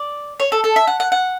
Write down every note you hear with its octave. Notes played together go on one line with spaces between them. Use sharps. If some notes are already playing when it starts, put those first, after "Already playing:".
Already playing: D5
C#5
A4
A4
E5
F#5
F#5
F#5